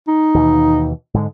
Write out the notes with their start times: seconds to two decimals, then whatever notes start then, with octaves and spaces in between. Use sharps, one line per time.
0.08 D#4
0.34 D#2 B2 E3
1.14 G#2 D3 G#3